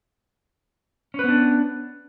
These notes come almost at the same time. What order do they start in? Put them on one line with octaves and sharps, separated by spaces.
C#4 B4 B3 D4